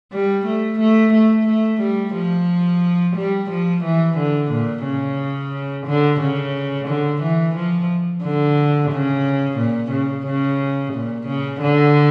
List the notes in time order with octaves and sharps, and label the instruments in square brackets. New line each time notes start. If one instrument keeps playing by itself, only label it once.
[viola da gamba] G3
A3
A3
A3
A3
G3
F3
G3
F3
E3
D3
A#2
C#3
D3
C#3
D3
E3
F3
D3
C#3
A#2
C#3
C#3
A#2
C#3
D3